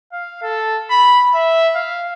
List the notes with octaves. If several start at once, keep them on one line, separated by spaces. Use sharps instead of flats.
F5
A4
B5
E5
F5